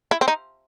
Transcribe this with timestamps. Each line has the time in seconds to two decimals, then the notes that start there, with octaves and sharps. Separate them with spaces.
0.11 E4
0.21 C4
0.28 D#4